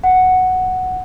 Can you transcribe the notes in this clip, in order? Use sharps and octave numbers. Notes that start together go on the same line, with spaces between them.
F#5